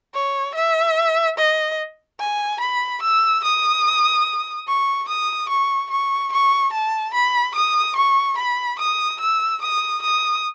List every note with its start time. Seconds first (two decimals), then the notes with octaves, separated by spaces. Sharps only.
0.14 C#5
0.55 E5
1.38 D#5
2.20 G#5
2.60 B5
3.02 E6
3.44 D#6
4.67 C#6
5.08 D#6
5.49 C#6
5.91 C#6
6.32 C#6
6.73 A5
7.14 B5
7.55 D#6
7.96 C#6
8.37 B5
8.79 D#6
9.20 E6
9.61 D#6
10.02 D#6